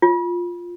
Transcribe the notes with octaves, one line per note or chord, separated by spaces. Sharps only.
F4